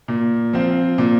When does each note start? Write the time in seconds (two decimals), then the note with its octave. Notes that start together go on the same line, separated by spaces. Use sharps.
0.08 A#2
0.53 F3 C4 F4
0.98 A#2